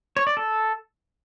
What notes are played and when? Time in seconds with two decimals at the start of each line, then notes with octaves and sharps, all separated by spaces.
0.17 C#5
0.27 D5
0.37 A4